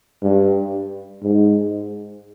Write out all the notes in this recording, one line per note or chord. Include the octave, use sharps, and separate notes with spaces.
G2
G#2